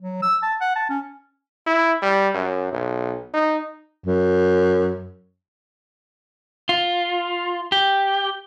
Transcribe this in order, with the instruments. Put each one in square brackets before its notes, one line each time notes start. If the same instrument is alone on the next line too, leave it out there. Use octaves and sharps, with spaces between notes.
[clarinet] F#3
E6
A5
F#5
A5
C#4
[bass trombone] E4
G3
F#2
B1
D#4
[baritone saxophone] F#2
[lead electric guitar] F4
G4